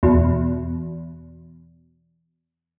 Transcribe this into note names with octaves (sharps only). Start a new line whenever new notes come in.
E2 B2